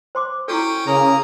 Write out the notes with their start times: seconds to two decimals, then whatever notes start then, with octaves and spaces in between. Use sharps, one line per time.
0.15 C5 C6 D6
0.48 C#4 E4 F#4 A4 G5
0.87 C#3 A#3 A#5 D#6